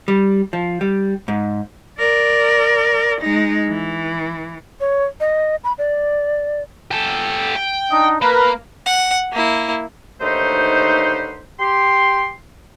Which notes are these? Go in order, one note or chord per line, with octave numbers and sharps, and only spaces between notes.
G3
F3
G3
G#2
A#4 D5
G#3 D#4
E3
C#5
D#5
B5
D5
G4 A4
G5
D4 D#4 D#5
A#3 A#4 B4
F#5
A#3 E4
D#2 D3 A3 D#4 B4 C5
G4 C6